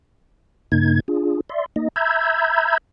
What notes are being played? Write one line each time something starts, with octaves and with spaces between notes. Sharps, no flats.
G2 C#3 A#3 D#4 G#6
D4 F4 G#4
D5 E5 C6
A#3 D#4 D#5
E5 A#5 B5 E6 G6 G#6